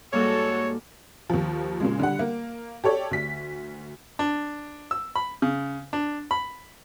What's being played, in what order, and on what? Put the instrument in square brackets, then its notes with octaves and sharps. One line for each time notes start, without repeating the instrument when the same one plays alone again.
[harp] G#2 G3 A#3 [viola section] F#4 A4 [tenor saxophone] C#5
[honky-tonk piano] D#2 F3
A#2 C#3 G#3
D3 G3 F#5
A#3
G4 A4 C#5 D5
D2 B6
[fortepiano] D4
E6
B5
C#3
D4
B5